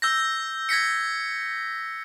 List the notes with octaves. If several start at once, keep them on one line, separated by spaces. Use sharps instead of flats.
E6 G6 A#6
G#6 A#6 B6 C#7